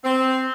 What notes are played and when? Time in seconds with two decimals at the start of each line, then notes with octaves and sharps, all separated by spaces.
0.05 C4